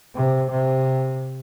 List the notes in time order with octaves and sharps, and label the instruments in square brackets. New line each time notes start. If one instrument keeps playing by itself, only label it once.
[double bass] C3
C3